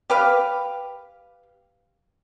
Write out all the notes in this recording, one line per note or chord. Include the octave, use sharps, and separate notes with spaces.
G4 B4 F5